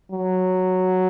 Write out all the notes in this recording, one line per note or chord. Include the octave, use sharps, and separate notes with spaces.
F#3